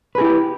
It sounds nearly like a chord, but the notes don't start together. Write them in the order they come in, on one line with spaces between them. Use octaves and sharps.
B4 G#4 E4 G4